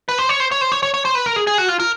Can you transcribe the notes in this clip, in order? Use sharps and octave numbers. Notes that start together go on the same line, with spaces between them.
B4
C5
C#5
C5
C#5
C5
C#5
C#5
C#5
C5
B4
A#4
G#4
G#4
F#4
F4
A#4